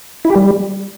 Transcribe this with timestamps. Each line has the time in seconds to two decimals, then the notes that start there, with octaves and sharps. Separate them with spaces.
0.25 E4
0.30 G4
0.36 G3